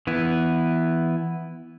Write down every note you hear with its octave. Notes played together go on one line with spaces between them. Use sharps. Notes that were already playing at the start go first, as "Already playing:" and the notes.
E3 B3 E4